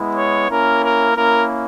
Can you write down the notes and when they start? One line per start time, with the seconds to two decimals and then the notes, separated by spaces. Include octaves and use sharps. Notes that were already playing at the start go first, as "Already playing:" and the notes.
Already playing: G#3 B3 E4
0.16 C#5
0.49 A#3 C#4 E4 A#4
0.83 A#4
1.15 A#3 C#4 E4 A#4